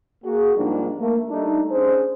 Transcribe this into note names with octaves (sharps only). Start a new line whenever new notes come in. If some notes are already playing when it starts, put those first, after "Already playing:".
A#3 F#4 G#4
G#2 F3 G3 A#3 D4 D#4
A3 A#3
G3 A3 D4 D#4
C#4 D4 G#4 C5